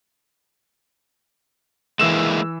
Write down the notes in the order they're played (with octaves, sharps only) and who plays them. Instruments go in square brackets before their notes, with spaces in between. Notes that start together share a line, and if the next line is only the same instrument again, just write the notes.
[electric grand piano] E3 E6 E7 [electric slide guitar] G#3 A#3 E4